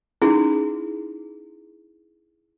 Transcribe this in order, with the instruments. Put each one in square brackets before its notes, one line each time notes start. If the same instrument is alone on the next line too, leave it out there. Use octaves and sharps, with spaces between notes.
[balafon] C#4 D#4 [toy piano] E4 G#4